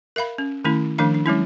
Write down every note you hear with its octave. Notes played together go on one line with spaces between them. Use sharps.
A#4 E5 F5 B5
C#4
D#3 A3 C#4 E4
D#3 F3 A3 D4 F5
D4
F#3 G#3 C#4 E4